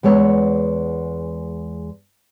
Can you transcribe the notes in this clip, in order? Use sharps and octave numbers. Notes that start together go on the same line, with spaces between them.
E2 G#3 B3 C#5